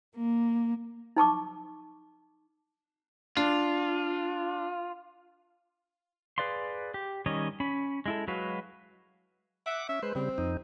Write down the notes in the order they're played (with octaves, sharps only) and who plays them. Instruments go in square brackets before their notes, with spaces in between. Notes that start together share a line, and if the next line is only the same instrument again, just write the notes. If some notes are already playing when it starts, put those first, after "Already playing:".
[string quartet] A#3
[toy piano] D#4 A5 C#6 D6
[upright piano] D4 [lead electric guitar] F4
[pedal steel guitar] G#4 B4 D5 F5 C6
G4
D#3 G3 C#4 C#5 D#5
C#4 B5
G#3 E4 A4
F#3 G#3 F#4 B4 F5
[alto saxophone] E5 [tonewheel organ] F#5 D6
[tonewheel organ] C#4 [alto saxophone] E5
[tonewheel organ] G#3 C5 [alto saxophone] B4
[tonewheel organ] C#3 G3 [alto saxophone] C4
[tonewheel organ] F2 D#4